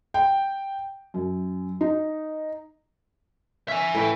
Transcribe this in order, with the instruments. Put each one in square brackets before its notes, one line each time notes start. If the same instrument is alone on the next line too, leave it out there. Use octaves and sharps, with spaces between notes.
[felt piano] G5
F#2
D#4
[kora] C#4 [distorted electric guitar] E5 G#5
[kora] A2 B4 G5